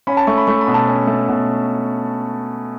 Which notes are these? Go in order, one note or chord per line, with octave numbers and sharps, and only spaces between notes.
C#4 B5
A5
A3 C#6
B5
A3 C#6
B5
B2
A5
C#4
A3
B2